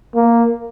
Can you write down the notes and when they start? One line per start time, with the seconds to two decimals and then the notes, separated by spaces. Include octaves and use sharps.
0.15 A#3